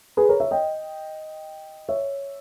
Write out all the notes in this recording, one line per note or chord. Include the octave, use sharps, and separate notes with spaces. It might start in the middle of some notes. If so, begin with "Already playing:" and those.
G#4 B4
A#4 C#5
C#5 E5
D#5 G5
C#5 E5